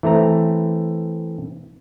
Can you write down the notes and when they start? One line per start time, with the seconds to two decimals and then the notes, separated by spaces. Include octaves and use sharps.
0.03 E3 A3 C4 A#5